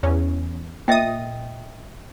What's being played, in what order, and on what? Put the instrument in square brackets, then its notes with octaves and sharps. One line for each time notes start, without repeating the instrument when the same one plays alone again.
[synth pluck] E2 C#4
[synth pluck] A#2 D#6 [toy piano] D#5 E5 G5